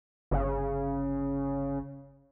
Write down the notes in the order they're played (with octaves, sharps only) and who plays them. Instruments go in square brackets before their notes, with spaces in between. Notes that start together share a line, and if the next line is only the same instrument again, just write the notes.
[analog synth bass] G1 [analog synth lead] C#3